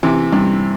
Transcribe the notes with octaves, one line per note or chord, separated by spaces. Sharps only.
C3 E3
G2 C3